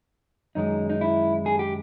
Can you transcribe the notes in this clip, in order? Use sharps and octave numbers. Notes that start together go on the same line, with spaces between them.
F#2 D#3 G#3 D#4
D#4
E4
G#4
G4